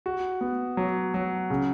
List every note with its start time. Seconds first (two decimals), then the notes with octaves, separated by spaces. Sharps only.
0.06 F#4
0.41 B3
0.77 F#3
1.14 F#3
1.50 C#3